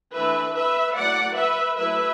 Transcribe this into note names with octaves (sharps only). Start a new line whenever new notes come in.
E3 A3 D4 B4 E5
B4 E5
F#3 A3 E4 D5 F#5
B4 E5
F#3 A3 E4 B4 E5